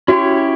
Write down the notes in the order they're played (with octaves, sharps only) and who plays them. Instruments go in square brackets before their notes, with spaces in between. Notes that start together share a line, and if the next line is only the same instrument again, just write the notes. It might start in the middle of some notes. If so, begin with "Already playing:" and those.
[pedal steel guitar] C#4 E4 G4 C#5 [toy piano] F#4